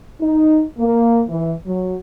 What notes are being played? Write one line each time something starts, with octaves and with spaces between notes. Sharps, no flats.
D#4
A#3
E3
F#3